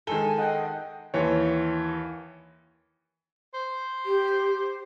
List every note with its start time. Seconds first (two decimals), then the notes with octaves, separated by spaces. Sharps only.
0.07 D#3 G#3 A4 G#5 G7
0.38 D#5 F#5 G5
1.14 D#2 E3 C#5
3.54 C5
4.06 G4